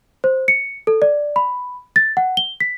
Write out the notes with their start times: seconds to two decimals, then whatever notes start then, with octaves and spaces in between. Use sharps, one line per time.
0.24 C5
0.48 C#7
0.87 A4
1.02 D5
1.36 B5
1.96 A6
2.17 F#5
2.37 G7
2.60 B6